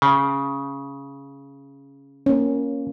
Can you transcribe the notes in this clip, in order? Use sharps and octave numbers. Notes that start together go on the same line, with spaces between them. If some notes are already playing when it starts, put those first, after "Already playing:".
C#3
A#3 C#4